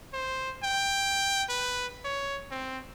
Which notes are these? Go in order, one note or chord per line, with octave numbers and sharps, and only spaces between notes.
C5
G5
B4
C#5
C4